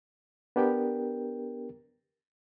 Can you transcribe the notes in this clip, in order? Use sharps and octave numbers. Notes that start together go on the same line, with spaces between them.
B3 D4 G4 A#4 G5